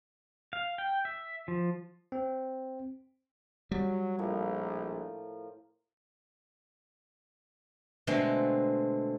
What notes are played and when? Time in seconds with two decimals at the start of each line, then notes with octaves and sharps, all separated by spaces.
0.53 F5
0.78 G5
1.05 E5
1.48 F3
2.12 C4
3.71 F#3 G3
4.18 A#1 A2 F3 A#4
8.07 B2 D3 G#3 A3 C4